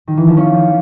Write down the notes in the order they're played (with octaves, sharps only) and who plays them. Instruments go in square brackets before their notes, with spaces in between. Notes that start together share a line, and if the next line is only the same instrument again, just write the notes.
[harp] D#3
E3
F3
C#4